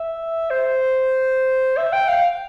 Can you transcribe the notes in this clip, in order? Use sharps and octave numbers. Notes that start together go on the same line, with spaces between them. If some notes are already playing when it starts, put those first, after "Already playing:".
Already playing: E5
C5
E5
G5
F5